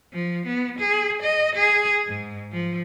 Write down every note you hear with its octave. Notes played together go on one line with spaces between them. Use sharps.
F3
B3
G#4
D#5
G#4
G#2
F3